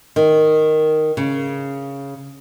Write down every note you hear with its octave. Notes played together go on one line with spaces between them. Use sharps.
D#3
C#3